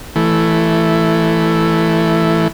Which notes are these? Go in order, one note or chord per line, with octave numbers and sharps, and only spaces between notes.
E3 A3